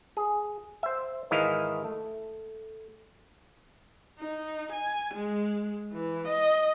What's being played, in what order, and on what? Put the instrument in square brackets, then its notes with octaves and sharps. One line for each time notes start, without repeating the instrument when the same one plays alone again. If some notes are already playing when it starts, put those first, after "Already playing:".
[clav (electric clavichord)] G#4
C5 E5
G#2 D#3 E3 E4 D#5 F5
A3
[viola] D#4
G#5
G#3
E3
D#5